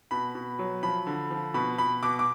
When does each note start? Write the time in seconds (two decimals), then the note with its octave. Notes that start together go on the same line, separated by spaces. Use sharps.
0.11 B2 B5
0.35 B2
0.59 F#3
0.83 F3 B5
1.07 D3
1.31 F3
1.54 B2 B5
1.78 B2 B5
2.03 B2 D6
2.19 D6